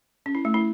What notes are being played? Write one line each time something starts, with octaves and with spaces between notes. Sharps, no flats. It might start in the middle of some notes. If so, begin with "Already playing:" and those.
C#4
E4
A3
E4